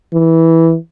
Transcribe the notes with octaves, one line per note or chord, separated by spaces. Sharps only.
E3